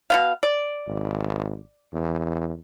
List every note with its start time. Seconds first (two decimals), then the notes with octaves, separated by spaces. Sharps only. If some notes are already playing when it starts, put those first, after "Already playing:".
0.10 B2 B3 F5
0.43 D5
0.87 G#1
1.93 E2